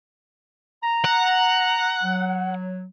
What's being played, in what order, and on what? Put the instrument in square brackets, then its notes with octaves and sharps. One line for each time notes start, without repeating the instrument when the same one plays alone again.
[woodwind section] A#5
[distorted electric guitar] F#5
[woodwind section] F#3